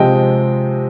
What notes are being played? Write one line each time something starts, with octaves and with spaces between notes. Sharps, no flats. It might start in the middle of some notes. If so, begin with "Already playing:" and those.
Already playing: C3 F3 G#3 D#5 G5